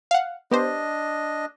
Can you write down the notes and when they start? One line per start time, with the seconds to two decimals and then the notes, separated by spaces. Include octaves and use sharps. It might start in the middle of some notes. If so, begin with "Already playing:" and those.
0.11 F5 F#5
0.51 B3 D4 G4 C5 D#5